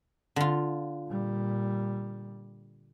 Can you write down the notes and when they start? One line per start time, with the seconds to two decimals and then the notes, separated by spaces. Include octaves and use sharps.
0.36 D3 F4
1.08 A#2 G3